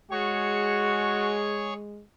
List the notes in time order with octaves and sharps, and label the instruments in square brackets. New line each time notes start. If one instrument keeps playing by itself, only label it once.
[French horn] G#3 [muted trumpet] F#4 [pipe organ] G#4 C#5 C#6